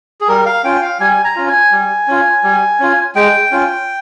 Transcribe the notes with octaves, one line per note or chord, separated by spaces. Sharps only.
G#4
G3 A#4
F5
C#4 F4 G5
F5
G3 G#5
A#5
C#4 F4
G#5
G3
C#4 F4
G3
C#4 F4
G#3 G5
C#4 F4